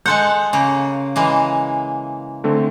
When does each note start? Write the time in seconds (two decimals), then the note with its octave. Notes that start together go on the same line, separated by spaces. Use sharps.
0.06 G#3 A4 F#5 C6 F#6 G6
0.53 C#3 A#3
1.16 E3 G#3 A#3
2.44 D3 A3 C4